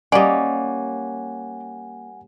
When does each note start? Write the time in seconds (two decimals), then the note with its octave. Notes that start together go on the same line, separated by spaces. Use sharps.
0.12 G3 A#3 C#4 D5 D#5 F#5 G#5